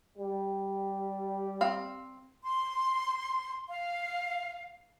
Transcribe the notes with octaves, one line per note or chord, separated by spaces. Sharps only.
G3
C4 F5
C6
F5